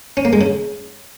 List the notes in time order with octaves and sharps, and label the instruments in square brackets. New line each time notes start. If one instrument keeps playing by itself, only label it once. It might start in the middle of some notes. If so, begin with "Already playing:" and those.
[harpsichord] C#4
A#3
G#3
C#3